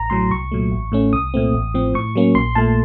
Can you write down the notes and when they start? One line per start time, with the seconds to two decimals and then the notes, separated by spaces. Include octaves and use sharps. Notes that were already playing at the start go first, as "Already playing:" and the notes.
Already playing: A1 A#5
0.10 A2 F#3 C6
0.31 C2 C#6
0.52 A#2 F#3 A3
0.72 A1
0.92 A2 A3 C#4
1.13 C2 D#6
1.34 A#2 A3 C4
1.54 A1
1.74 A2 F3 C4
1.94 A2 C#6
2.16 F#3 A#3 C#4
2.35 A#1 C6
2.55 A#2 A3 A5